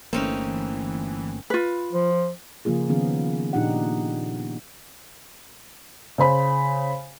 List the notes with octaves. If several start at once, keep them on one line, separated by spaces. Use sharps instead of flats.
G1 E3 A3 A#3 C4 C#4 D#4
F4 B4
F3
C#3 F3 A#3 F4 G#4
D#3 F3 B3 C#4 G#4
A#2 D4 D#4 G4 F#5
C#3 C5 B5